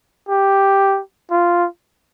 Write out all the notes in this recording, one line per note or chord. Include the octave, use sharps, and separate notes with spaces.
G4
F4